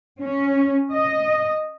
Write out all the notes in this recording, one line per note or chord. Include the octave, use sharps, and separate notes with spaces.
C#4
D#5